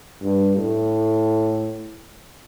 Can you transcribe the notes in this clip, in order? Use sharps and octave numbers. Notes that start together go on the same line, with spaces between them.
G2
A2